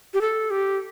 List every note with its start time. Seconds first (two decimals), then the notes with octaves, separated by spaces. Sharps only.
0.14 G4
0.21 A4
0.50 G4